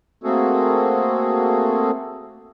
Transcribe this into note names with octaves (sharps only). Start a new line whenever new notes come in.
A3 A#3 C4 F#4 G#4 A4